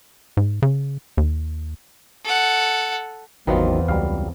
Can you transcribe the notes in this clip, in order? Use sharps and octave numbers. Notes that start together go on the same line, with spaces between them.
G#2
C#3
D#2
A4 F#5
A1 E2 D#3 F#3 B3 C4 D#4 F4
C#2 F#3 G3 F5